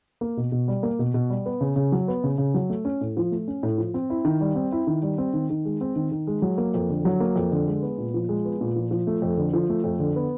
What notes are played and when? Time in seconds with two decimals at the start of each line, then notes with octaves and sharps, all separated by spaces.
0.21 A#3
0.37 B2
0.52 B2
0.68 G3
0.83 A#3
0.99 B2
1.14 B2
1.30 G3
1.46 B3
1.61 C#3
1.76 C#3
1.92 F#3
2.08 B3
2.24 C#3
2.38 C#3
2.54 F#3
2.70 A3
2.85 C#4
3.01 A2
3.17 F3
3.32 A3
3.48 C#4
3.63 A2
3.78 F3
3.94 C4
4.10 E4
4.25 D#3
4.41 G3
4.56 C4
4.72 E4
4.87 D#3
5.03 G3
5.18 C4
5.34 D#3
5.50 D#3
5.65 G#3
5.81 C4
5.96 D#3
6.12 D#3
6.27 G#3
6.42 F#3
6.58 A#3
6.74 F2
6.89 D3
7.05 F#3
7.20 A#3
7.36 F2
7.52 D3
7.67 G#3
7.82 B3
7.98 A#2
8.14 F3
8.29 G#3
8.45 B3
8.61 A#2
8.76 F3
8.91 F3
9.07 A3
9.22 F2
9.37 D3
9.54 F3
9.69 A3
9.84 F2
9.99 D3
10.16 B3